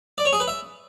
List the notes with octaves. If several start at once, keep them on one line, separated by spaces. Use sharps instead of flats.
D5
C#5
G#4
B4
E5